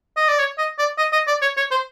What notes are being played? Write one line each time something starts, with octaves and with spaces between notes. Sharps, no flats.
D#5
D5
C#5
D#5
D5
D#5
D#5
D5
C#5
C#5
C5